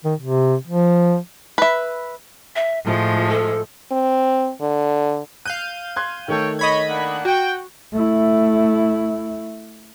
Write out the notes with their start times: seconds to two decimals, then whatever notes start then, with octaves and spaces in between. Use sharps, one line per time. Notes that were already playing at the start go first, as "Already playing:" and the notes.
0.04 D#3
0.20 C3
0.67 F3
1.58 B4 E5
2.56 E5
2.86 A2 F3 G#3 F4
3.29 A4
3.92 C4
4.61 D3
5.45 F5 F#6 G6 D#7
5.96 C6 F#6 G#6
6.28 D#3 A3 A4 C#5 G5
6.59 C#5 D#5 B5 G#6
6.89 A#3 D4 F#5
7.25 F#4 G5
7.93 A3 E4